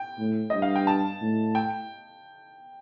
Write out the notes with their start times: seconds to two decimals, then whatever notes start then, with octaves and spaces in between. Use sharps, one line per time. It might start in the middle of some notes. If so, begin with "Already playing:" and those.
Already playing: G5
0.19 A2
0.50 G2 D#5
0.62 F5
0.76 G5
0.87 A5
1.21 A2
1.55 G5